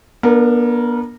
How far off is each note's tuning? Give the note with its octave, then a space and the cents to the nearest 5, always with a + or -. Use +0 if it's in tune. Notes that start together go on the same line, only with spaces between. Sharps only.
B3 -45 D4 +0 A#4 -15